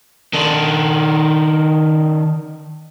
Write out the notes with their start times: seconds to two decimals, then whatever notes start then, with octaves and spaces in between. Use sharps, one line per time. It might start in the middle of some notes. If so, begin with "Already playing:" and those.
0.33 D#3 D4